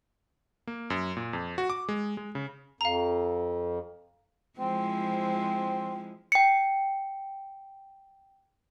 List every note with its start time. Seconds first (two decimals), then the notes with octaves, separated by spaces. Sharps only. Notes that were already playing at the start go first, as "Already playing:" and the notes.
0.67 A#3
0.90 F#2
1.17 A#2
1.33 F2
1.58 F#4
1.70 D6
1.89 G#3
2.17 G#3
2.35 C#3
2.81 F2 F5 A#5
4.59 F3 G#3 C4 E4
6.32 G5 C#7